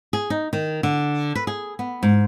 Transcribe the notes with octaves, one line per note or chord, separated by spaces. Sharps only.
G#4
D#4
D#3
D3
B4
G#4
B3
G#2